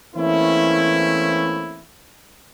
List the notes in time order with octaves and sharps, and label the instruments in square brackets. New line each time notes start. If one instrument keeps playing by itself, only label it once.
[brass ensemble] E3 A3 A#3 C4 C#4 E4